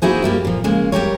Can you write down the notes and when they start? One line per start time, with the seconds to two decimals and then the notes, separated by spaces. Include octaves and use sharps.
0.02 A#3 D#4 E4 F#4 G#4 C5
0.22 G2 G3 A#3 G4
0.45 A#2 F3
0.64 C#3 G#3 A#3
0.92 G3 G4 A#4 C#5